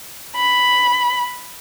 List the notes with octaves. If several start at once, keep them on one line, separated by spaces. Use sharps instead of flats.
B5